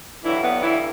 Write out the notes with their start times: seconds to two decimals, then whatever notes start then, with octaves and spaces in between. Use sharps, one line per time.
0.23 G2 D3 E3 F#3 E4
0.42 B3
0.60 E3 E4